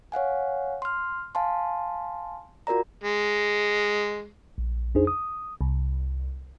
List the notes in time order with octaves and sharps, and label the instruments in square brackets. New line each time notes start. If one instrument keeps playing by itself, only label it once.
[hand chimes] C#5 F5 F#5 G#5
C6 F6
F5 G#5 A5 C6
F4 F#4 A#4 D5 A#5
[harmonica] G#3
[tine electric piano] A#1
F2 D4 D#4 G#4 C5
D#6
[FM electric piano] C2